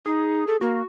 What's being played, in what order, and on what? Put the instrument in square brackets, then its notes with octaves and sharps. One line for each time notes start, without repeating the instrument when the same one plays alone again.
[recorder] D#4 [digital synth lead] G#4
[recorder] A4
[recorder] A#3 [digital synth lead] F#4